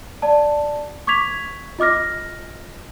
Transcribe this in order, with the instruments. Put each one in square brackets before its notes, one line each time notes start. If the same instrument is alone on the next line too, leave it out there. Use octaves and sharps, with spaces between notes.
[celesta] D5 A5
C#6 D6 G#6 B6 F7
F4 D#5 D6 F6 A#6